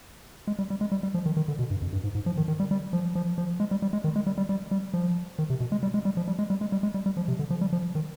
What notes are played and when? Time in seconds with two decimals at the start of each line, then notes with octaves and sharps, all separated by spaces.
0.47 G#3
0.59 G3
0.70 G3
0.81 G#3
0.92 G3
1.03 G3
1.14 F3
1.26 D#3
1.37 D#3
1.48 D3
1.59 B2
1.70 G2
1.82 F2
1.93 G2
2.04 G#2
2.15 G#2
2.26 F3
2.37 D#3
2.48 D#3
2.60 G3
2.71 G3
2.93 F3
3.15 F3
3.38 F3
3.60 G#3
3.71 G3
3.82 G3
3.93 G#3
4.04 D#3
4.16 G#3
4.27 G3
4.38 G3
4.49 G3
4.71 G3
4.94 F3
5.39 D#3
5.50 C3
5.60 B2
5.72 G#3
5.83 G3
5.94 G#3
6.05 G3
6.17 F3
6.28 G3
6.39 G#3
6.50 G3
6.61 G#3
6.72 G3
6.83 G#3
6.94 G3
7.06 G3
7.17 F3
7.28 C3
7.39 D3
7.50 F3
7.61 G3
7.73 F3
7.95 D#3